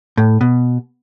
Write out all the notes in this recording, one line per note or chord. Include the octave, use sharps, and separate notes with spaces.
A2
B2